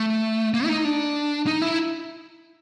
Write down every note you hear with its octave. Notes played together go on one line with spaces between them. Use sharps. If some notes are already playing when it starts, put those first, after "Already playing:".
Already playing: A3
A#3
E4
D#4
D4
D#4
E4